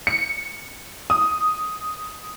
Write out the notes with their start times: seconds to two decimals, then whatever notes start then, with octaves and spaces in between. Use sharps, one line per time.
0.07 C#7
1.10 D#6